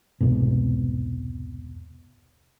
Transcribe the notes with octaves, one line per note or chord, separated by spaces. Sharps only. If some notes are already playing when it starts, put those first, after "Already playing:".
E1 C2 G#2 B2